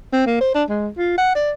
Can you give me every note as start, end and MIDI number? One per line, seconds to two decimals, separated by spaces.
0.13 0.26 60
0.27 0.39 58
0.41 0.54 72
0.55 0.64 62
0.69 0.88 56
0.97 1.17 65
1.18 1.33 78
1.35 1.51 74